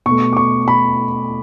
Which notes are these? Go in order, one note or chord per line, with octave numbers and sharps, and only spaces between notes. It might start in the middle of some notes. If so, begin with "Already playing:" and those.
B2 A3 C#6
D6
C#6
B5